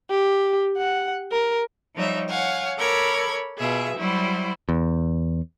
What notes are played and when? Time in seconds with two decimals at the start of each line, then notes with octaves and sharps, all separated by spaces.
0.11 G4
0.78 F#5
1.32 A#4
1.95 F3 G3 D#4 C#5 E5
2.28 C#5 F5 F#5 G#5
2.78 A4 A#4 C#5 B5 D6 G#6
3.58 B2 F4 G#4 E5
3.97 F#3 G3 E4 F#4 C5
4.69 E2